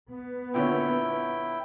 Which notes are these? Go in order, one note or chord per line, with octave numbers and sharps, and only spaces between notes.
B3
A#2 D3 C#4 E4 G5